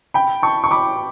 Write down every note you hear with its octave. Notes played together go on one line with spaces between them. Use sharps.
G5 B5
A5 C#6
C#6
B5 D6